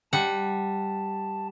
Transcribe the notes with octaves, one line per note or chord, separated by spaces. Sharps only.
G3 F#5 A5